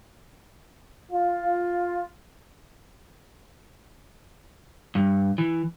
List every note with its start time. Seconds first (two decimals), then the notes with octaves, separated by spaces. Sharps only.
1.11 F4
4.95 G2
5.38 E3